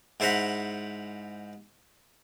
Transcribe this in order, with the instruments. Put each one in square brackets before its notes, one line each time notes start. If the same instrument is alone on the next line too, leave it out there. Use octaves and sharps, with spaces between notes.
[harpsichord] G#2 E4 C5 F#5 A#5 B5